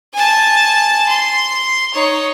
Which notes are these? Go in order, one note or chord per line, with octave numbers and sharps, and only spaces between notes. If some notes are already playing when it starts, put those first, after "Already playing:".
G#5 A5
C6
D#4 C#5